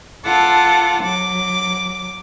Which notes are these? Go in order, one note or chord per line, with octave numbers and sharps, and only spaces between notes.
F4 A4 F#5 A5 D6
F#3 D6